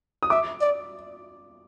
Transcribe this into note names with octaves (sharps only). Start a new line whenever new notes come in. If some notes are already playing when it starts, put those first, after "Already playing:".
D#6
E5 D6
D5